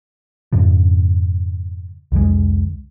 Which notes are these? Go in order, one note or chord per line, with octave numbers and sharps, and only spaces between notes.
F2 G#2 C#3 F3
C2 F2 D3 G#3